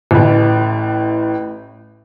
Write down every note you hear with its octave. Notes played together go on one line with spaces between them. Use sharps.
A1 A2